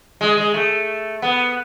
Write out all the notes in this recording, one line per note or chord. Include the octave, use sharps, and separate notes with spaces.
G#3
G#3
A3
B3